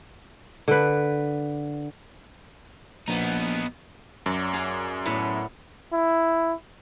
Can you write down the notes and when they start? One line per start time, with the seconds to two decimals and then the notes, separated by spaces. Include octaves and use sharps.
0.68 D3 B4
3.08 A#1 B3 D#4
4.26 F#2 F#3 D5
4.53 G#4 D5 F5
5.06 A2 B3 B4
5.93 E4